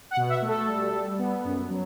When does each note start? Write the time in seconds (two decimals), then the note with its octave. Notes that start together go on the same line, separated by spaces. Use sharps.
0.11 F#5
0.17 B2
0.29 E5
0.42 A3
0.48 A4
0.68 G3
0.93 G3
1.19 B3
1.45 F#2
1.70 F#3